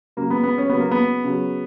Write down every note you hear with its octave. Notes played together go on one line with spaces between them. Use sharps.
C#3 F#3 A#3
B3
B3
C#4
C#3 F#3 B3
A#3
B3
C#3 F#3